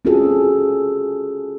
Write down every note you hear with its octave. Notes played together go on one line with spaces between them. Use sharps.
C4 C#4 F4 F#4 G#4 A4